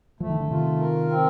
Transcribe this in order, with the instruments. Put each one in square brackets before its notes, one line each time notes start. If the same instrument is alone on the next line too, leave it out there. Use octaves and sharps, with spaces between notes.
[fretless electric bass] F3 [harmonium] A3
[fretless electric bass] D#3
D3
[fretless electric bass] C3 D#3 [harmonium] F4
[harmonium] A#4
C4